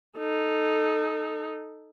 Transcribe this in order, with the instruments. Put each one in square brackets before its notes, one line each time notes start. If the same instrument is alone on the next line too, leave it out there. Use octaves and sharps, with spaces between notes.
[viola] D#4 A4